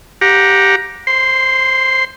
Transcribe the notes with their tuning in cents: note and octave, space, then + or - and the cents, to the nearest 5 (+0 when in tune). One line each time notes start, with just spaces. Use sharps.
G4 +0 F#5 -25 A#5 +10
C5 +15 C6 -10